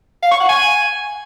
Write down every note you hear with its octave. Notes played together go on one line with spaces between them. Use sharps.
F5
C#6
F#5
G#5